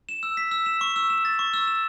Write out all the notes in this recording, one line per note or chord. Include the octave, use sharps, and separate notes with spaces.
E7
E6
B6
E6
E7
C#6
E6
E7
A6
C#6
E6
E7